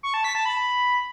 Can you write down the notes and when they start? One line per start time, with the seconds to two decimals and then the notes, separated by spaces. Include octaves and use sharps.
0.03 C#6
0.14 A5
0.24 B6
0.35 A5
0.45 B5